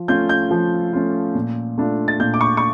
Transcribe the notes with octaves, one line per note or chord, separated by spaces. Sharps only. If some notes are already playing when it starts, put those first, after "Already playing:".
Already playing: F3
A3 C#4 F4 G6
G6
F3
A3 C#4 F4
A#2
A3 D4 F4
A6
A#2 G6
D6
C#6
C#6